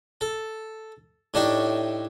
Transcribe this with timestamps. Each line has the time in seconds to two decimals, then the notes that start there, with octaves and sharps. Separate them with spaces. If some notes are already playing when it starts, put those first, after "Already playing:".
0.21 A4
1.34 A2 D4 D#4 G4 C#6